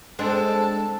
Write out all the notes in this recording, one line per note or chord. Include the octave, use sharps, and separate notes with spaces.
G#3 C4 D4 A4